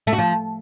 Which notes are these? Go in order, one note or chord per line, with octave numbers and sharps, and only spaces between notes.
A3
F#4
F3